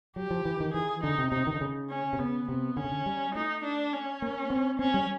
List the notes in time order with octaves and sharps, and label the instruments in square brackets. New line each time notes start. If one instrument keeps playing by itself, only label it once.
[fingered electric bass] F#3 [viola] G4
[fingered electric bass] F3
E3
D#3
[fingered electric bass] E3 [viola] G#4
[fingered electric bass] D3 [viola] D#4
[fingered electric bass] C3
[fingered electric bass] C3 [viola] D#4
[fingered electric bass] D#3
D3
C#3
[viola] C#4
[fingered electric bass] C3
[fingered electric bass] C#3 [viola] B3
[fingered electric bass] C3 [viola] B3
[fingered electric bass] D3 [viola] C#4
[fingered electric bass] C#3
D3
G3
[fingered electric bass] A3 [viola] D#4
[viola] D4
C#4
[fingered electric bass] A#3
C4
[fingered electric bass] C4 [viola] C#4
[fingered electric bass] G3